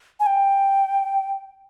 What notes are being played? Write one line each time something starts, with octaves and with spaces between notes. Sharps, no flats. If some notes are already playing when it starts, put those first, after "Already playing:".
G#5
G5